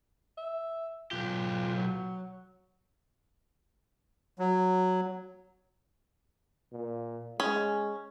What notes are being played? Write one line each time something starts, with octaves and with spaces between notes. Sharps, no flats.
E5
B1 F4 G4
F#3
F#3
A#2
G#3 C#4